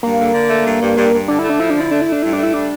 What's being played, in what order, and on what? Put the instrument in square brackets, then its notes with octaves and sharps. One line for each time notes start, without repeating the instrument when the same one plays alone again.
[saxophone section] G2 [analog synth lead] A#3
[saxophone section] D3
D3
A3
G2
G2
G2
G2
[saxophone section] D3 [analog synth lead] D4
[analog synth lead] E4
[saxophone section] A3
[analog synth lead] D4
[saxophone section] F3 [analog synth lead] E4
[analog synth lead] D4
[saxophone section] D3 [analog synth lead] E4
[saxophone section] A3 [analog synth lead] D4
[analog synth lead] E4
[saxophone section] A3 [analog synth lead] D4
[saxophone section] G2 [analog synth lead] E4
[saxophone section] A3 [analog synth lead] D4
[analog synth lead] E4
[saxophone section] G3 [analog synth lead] D4